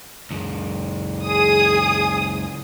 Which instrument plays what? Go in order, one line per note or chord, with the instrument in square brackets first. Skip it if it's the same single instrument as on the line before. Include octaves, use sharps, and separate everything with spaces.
[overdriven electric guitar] C#2 F#2
[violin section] G#4 D#6